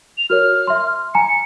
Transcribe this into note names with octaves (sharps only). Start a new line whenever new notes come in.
F7
F#4 A#4 C#5 F6
E5 C6
G#5 A#5 C#7